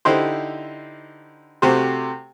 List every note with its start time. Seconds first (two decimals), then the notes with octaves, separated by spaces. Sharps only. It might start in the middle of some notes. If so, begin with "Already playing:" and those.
0.05 D3 D#4 E4 G4 C5
1.62 C3 A3 F#4 G4 C5